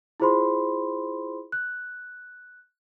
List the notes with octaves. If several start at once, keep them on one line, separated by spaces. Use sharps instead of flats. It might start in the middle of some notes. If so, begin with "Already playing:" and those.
E4 F4 G#4 C5 B5 C6
F#6